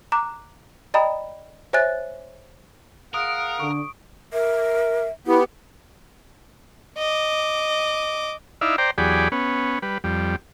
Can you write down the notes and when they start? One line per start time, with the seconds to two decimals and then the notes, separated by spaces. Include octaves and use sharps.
0.12 A#5 D6 F#6
0.94 D5 D#5 G5 A#5 B5 D#6
1.73 C5 C#5 E5 G#5 F#6 A6
3.14 G#4 A#4 F5 F#5 D#6 D7
3.60 D3 C#6 D7
4.33 A#4 E5
5.27 B3 E4 G4
6.98 D#5 D6
8.61 D#4 E4 D5 E5 F5
8.78 C5 D5 G5 A#5
8.98 E2 F#3 G4 G#4 D5 B5
9.32 B3 C#4
9.82 G3 B4
10.04 F2 G3